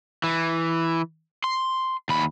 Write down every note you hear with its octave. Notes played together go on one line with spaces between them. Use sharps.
E3
C6
D#2 B5